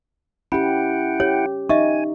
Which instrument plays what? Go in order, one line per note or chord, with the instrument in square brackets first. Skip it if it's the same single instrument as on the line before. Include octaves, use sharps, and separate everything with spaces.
[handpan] C#4 G4 [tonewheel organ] E4 F#5 G5 [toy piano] B5
[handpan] G4 [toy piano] C#5
[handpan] D#4 [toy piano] D#5 E5 C#6 [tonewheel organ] G#5